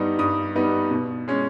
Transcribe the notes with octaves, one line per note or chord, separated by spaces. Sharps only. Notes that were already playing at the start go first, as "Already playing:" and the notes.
Already playing: G2 G3 B3 D#4
G2 D#6
G3 B3 D#4
B2
G#3 C#4